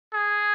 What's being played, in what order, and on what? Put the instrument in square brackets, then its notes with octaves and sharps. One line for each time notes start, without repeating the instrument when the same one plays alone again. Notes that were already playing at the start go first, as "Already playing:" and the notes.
[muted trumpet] G#4